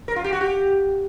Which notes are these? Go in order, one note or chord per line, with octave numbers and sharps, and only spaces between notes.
A#4
F4
G4
F#4
G4